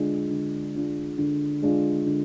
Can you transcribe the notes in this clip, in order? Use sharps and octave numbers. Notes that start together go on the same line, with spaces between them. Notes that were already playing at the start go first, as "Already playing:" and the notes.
Already playing: D3 G#3 D4 F4
D3
G#3 D4 F4
D3
G#3 D4 F4
D3